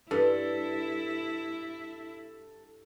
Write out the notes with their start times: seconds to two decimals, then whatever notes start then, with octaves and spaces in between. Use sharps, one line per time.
0.11 G2 E4 A4